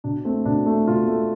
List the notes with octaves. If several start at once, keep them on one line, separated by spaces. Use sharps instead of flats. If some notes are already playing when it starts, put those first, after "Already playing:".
B2 D4
A3 C4
B2 D4
A3
B2 F4
A3